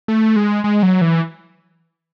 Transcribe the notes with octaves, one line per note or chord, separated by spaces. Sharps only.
A3
G#3
G#3
F#3
E3